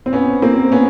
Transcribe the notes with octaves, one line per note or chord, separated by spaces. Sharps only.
C4
B3 C#4
A#3 C4
B3 C#4